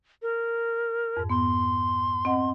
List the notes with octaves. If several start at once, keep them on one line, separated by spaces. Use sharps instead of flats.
A#4
F2 G#2
B3 C6
C4 D#5 F#5